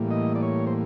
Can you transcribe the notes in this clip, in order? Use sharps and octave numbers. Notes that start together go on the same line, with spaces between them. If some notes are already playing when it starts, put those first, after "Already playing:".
Already playing: A2 E3 G3 A#3
D#5
D5
C#5
C5